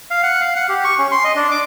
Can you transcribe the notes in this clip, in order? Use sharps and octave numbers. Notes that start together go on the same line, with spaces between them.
F5
F#5
F5
F#5
G4
C#6
C#4
C6
D#5
D4
D6